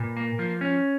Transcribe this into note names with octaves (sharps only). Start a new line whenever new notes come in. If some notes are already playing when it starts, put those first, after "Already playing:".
Already playing: A#2 B4
A#3
F3
C#4